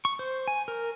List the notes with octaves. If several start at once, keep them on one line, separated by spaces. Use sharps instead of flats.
C#6
C5
G#5
A#4